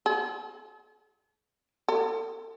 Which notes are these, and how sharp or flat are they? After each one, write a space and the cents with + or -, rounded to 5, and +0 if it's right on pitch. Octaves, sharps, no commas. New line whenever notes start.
A4 -45
A4 +35